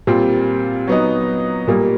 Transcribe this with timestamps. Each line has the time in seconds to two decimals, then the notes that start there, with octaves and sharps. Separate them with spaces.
0.07 A#2 G3 C4 F4
0.87 F#3 B3 D#4
1.68 A#2 G3 A#3